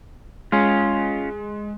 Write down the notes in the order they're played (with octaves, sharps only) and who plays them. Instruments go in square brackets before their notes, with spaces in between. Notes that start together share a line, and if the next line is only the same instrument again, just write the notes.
[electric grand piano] G#3 [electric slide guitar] C#4 F4